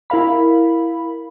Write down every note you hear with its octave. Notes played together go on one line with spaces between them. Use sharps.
E4 A#4 F5 B5